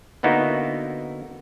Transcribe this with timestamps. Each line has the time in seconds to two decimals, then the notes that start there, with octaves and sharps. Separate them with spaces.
0.23 D3 A#3 B3 D#4 E4 F#4